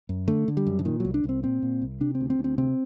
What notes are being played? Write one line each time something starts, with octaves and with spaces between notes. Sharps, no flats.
F#2
D3 A3
D3
G3
F#2
D3
A#2 D#3
C2 F#3
D4
C2
C4
A#2 C4
A#2
C2
C3 D4
C4
D2
C4
D2
C4
C3 C4